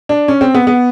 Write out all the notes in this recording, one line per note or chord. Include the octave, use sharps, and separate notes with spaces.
D4
C#4
C4
B3
B3